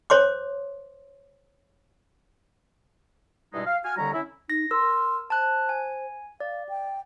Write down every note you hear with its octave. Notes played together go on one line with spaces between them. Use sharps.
C5 C#5 C6 D6
G2 B2 G3 G#3 D#4 E4
F5
F#4 G#5 F6
D#2 D3 G3 C#4 A#5
C#4 E4
D#4 A#6
A#4 C6 E6
C5 A5 F#6
G#5
D5 F5
G5